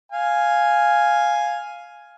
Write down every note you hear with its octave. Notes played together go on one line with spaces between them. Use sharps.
F5 G#5